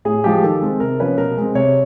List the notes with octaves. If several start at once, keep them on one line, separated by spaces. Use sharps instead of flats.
A2 G#4
F3 G#3 G4
D#3 A4
G#3 C4
C3 A#4
F3 A#3 C#4 B4
B2 A#4
G#3 C4
C3 C#5